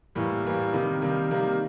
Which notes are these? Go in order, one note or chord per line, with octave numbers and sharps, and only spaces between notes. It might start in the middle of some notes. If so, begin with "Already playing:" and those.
A2 E3 G3 A#3
A2 E3 G3 A#3
C3 D#3 G3 A#3
C3 D#3 G3 A#3
C3 D#3 G3 A#3